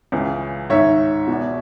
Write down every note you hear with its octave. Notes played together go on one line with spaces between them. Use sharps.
C#2 C#3 E3
G#2 D#3 C#5 E5
E2 B2